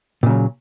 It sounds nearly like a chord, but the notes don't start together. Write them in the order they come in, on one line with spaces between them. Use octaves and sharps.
A#2 C#3 F#3